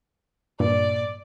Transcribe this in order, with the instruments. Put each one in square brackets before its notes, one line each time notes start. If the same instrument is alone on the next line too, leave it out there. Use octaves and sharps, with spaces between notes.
[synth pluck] G2 [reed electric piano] A#2 [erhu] D5